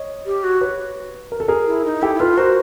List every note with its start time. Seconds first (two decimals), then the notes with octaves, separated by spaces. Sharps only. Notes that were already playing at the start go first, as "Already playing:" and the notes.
Already playing: C#5 D#5
0.26 G4
0.44 F#4
0.61 B4 C#5
1.32 A#4
1.40 A4
1.48 G#4 A#4
1.67 E4
1.85 D#4
2.02 E4 G4 A4
2.15 E4
2.20 F4 A4 B4
2.37 F#4 A#4 C5